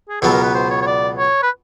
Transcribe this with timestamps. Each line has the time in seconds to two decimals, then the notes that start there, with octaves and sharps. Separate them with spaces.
0.09 G#4
0.21 C#2 B2 F#3 B3 A4
0.32 A#4
0.43 B4
0.55 C5
0.70 C#5
0.81 C#5
0.87 D5
1.18 C#5
1.43 B4